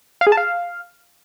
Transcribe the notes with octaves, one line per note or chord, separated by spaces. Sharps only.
F5
G#4
A5
F5